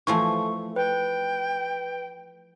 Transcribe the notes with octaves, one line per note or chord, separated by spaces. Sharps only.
E3 F3 A3 C#6
B4 G5